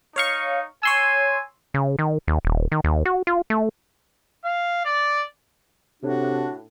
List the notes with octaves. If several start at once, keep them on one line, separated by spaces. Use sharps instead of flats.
D#4 C#5 F5 C#6
C#5 G#5 C6 E6
C#3
D#3
D#2
D#1
D#3
D#2
F#4
F4
A3
F5
D5
A2 C3 D4 F#4